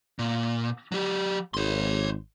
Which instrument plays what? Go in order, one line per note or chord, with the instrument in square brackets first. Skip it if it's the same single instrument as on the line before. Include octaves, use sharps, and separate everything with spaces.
[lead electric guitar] A#2
F#3 G4
[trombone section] G#1 [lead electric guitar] C#5 C6